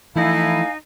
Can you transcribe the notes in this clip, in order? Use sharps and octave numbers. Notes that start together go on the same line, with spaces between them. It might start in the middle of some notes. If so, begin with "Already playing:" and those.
E3 F3 A3 D#4 E4 F5 G#5